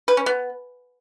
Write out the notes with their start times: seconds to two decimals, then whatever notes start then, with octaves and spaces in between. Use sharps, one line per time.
0.08 B4
0.17 C#4
0.26 B3